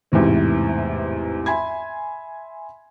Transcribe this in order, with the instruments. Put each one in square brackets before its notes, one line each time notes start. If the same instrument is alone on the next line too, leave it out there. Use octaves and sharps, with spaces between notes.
[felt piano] A1 E2 G#2 C3 E3
E5 G#5 B5 C6 G#6